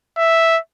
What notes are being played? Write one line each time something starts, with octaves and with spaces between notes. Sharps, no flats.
E5